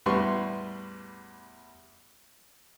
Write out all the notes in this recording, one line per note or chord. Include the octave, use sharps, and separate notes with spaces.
E2 A2 G3 B4 C6 C#6